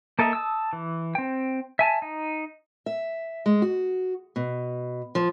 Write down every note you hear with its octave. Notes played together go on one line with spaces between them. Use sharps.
A#3 A4 D#5 E5 A#5
A5 D#6 E6
E3
C4 G5
E5 G#5 A5
D#4
E5
G#3
F#4
B2
F3